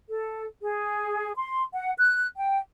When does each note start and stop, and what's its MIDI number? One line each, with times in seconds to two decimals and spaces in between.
0.09 0.45 69
0.61 1.32 68
1.37 1.63 84
1.74 1.91 78
1.97 2.25 90
2.35 2.58 79